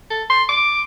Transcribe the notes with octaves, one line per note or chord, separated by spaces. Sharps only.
A4
C6
D6